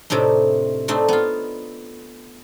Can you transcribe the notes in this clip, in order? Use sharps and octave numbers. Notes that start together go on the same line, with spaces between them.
A2 C3 C4 D4 D#4
A3 C4 D4 D#4
B3 F4